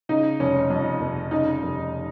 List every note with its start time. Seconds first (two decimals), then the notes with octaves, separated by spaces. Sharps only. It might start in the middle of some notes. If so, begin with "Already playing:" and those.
0.09 C#3 D#4
0.40 F1 C#4
0.70 F2
1.01 F1
1.31 C#3 D#4
1.62 F1